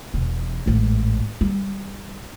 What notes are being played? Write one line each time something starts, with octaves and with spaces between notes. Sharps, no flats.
E1 E3
A1 G#2
G3